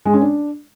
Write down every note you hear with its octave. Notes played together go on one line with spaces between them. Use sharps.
G#3
C#4
D4